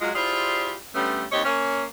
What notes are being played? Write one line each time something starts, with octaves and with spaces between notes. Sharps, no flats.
F#3 G#3 F4
E4 F4 G4 G#4 C5 D5
D3 G3 A3 B3 C#4
D#2 C4 G4 C#5 D#5
A#3 C#4 C#5